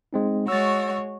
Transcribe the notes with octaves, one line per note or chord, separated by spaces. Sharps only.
G#3 C4 D#4
G#3 F#4 C#5 E6 A6